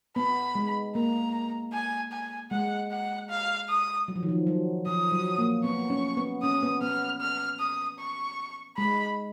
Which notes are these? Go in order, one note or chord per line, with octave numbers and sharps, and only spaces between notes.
B3 B5
G#3
A#3 A#5
G#5
G#5
G#3 F#5
F#5
F5
D#6
F#3
F3
D#3
F3
F#3
F3 D#6
F#3
A#3
B3 C#6
C#4
B3
C#4 D#6
B3
B3 F6
F6
D#6
C#6
G#3 B5